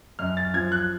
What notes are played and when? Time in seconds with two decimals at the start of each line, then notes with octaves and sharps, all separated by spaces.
0.19 F#2 F6
0.37 A6
0.54 F3 G#6
0.72 F#6